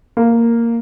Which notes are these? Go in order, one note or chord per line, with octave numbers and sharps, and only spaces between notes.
A#3